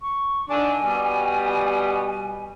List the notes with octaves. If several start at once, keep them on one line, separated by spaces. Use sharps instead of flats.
C#6
D3 D#3 D4 G#5
B2 G3